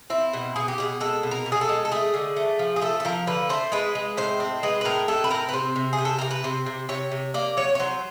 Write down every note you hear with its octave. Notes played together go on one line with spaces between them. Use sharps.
C4 E4
B2
B2 G#4
G4
B2 G#4
G#3 A4
B2
A#4
B2
G#4
A4
G#3
A4
A3 G#4
D3
A3
F3
G#4
A3 A4
A4
F3 A#4
D3 B4
A3 C5
G#3 B4
G#3
A2 C5
C4
G#3 B4
B4
A2 A#4
A2 A4
B4
C4 A#4
B4
C3 C5
C3
G#4
C3
A4
C3 A#4
B4
C3 C5
C3
C3 C#5
C3
A#3 D5
F#3 C#5
C#5
F#3 C5